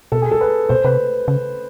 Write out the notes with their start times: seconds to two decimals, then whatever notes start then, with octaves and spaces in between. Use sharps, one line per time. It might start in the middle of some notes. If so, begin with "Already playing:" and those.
0.12 B2 A4
0.22 G#4
0.31 A4
0.41 B4
0.69 B2 C5
0.84 C3 B4
1.28 C#3